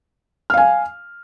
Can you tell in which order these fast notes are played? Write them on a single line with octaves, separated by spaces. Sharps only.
F6 F5 G#5